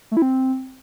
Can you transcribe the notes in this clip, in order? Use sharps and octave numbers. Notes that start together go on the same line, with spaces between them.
A3
E4
C4